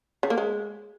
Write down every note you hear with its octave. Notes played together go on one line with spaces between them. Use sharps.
C#3
A#3
G#3